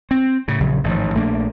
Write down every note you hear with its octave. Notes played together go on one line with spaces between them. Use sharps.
C4
A2 C#3
A#1 C#3 F#3
A1 G#2 D#3 F3
A#1 A3 A#3 D4